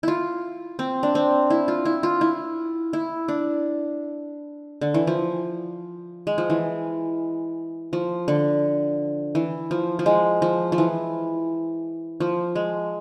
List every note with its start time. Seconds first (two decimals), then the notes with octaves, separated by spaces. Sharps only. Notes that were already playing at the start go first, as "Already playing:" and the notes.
0.03 E4 F4
0.79 C4
1.03 D4
1.15 C4
1.50 E4
1.68 F4
1.85 E4
2.03 F4
2.21 E4
2.93 E4
3.28 D4
4.81 D3
4.94 E3
5.07 F3
6.27 G#3
6.38 F3
6.50 E3
7.93 F3
8.28 D3
9.35 E3
9.71 F3
9.99 F3
10.06 G#3
10.42 F3
10.72 F3
10.78 E3
12.20 F3
12.55 G#3